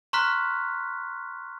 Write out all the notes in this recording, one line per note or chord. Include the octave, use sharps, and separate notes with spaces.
A#5 C6 C#6 F6 F#6 B6